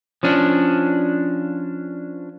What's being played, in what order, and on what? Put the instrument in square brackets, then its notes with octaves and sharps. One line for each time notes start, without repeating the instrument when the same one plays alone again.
[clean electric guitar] F3 C#4 D4